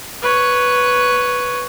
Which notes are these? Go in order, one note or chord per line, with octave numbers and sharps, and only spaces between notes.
B4 C#5